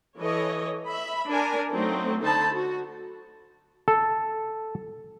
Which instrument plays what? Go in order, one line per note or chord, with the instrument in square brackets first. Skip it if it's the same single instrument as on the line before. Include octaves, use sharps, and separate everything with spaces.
[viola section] E3 A4 C#5 D#5
E5 B5
D4 A#4 G#5
F#3 A3 C4 D#4
D3 D#4 A4 C5 A5 B5
F#4
[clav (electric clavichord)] A4